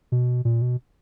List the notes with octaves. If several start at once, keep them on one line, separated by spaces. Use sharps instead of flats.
B2
A#2
B2